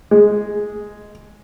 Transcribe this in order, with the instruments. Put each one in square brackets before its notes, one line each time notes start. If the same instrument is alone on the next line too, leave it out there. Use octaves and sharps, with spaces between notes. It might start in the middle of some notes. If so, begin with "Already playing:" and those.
[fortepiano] G#3